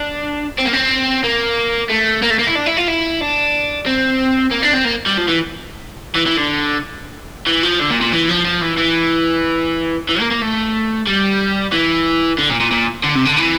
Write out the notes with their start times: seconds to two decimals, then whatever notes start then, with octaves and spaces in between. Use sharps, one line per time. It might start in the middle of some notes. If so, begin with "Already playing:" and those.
Already playing: D4
0.58 C4
0.65 A#3
0.73 C4
1.24 A#3
1.89 A3
2.22 A#3
2.30 A3
2.39 A#3
2.47 E4
2.55 D4
2.66 E4
2.77 F4
2.88 E4
3.21 D4
3.86 C4
4.51 A#3
4.63 D4
4.74 C4
4.85 A#3
5.07 G3
5.18 F3
5.28 E3
6.16 E3
6.27 E3
6.38 D3
7.47 E3
7.63 F3
7.79 D3
7.90 A#2
8.01 A#2
8.12 E3
8.29 F3
8.45 F3
8.62 E3
8.78 E3
10.09 E3
10.20 A#3
10.31 A#3
10.42 A3
11.07 G3
11.73 E3
12.38 D3
12.50 A#2
12.60 A#2
12.71 A#2
13.03 D3
13.15 C3
13.25 D3
13.37 E3